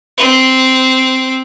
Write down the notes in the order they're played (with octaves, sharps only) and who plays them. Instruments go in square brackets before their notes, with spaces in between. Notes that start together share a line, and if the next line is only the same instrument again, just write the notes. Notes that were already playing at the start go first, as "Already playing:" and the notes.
[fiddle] C4